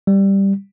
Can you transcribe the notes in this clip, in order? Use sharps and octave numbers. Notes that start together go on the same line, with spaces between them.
G3